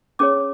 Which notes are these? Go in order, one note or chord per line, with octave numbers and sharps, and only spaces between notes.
C#4 G#4 C#5 D6